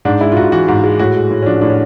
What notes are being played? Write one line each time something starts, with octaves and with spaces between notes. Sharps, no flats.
G#2 D4
G#3 E4
F4
G#2 F#4
E3 F#4
G#2
G#3
A2 F#4
G#3
A2
C#4
F3 D4
A2 D4
C#4